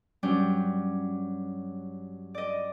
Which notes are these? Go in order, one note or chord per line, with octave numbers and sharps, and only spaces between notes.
G2 F#3 G3 C#4 D4 G6
D5 D#5